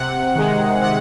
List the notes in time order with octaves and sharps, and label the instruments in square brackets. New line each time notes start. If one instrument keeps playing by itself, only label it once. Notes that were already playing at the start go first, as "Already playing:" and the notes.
Already playing: [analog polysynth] C3 F#5
D#3 G#3
C3 F#5